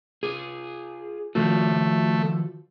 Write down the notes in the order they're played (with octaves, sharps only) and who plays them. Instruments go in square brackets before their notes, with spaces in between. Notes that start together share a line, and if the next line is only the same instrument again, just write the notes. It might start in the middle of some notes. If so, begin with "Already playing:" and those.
[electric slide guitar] F4 G#4
[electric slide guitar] D#3 F3 F#4 [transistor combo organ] A3